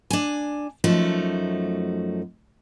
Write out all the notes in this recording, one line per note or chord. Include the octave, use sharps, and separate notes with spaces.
D4 G#5
F#2 F3 A3 D#4 F#4